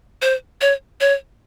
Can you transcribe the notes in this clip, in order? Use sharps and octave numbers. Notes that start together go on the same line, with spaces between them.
C5
C#5
C#5